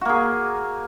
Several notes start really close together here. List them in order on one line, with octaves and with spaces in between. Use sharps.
F#4 A#3 G#4